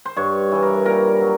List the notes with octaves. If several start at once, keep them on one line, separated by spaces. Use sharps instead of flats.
C5
G2 C#5
E3 G3
A#4
A#2 A#4
F#3